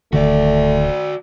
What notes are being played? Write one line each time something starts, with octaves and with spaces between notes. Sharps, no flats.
D1 D3 D#3 A3 F#4 D5